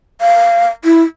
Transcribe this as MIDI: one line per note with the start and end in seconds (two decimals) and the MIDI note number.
0.21 0.68 77
0.84 1.03 64